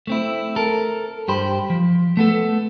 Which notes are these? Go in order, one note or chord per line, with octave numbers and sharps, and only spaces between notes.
A3 C4 E4
A4 A#4
G2 G4 C5 B5
F3
A3 B3 A4